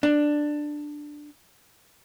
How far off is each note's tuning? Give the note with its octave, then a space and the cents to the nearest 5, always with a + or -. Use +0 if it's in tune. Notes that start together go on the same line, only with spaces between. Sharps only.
D4 +10